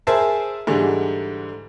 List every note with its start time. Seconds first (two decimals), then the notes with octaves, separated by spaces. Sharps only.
0.07 G#4 A#4 C5 E5 G#5 A5
0.67 G#2 D3 E3 G3